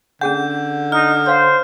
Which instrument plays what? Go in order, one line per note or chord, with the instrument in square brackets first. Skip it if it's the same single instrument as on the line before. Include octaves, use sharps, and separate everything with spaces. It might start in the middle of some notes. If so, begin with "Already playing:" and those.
[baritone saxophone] D3 [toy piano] C#4 G#4 F#5 [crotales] G6
[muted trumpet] D#4 [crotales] F6
[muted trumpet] C5 [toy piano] C#5 F5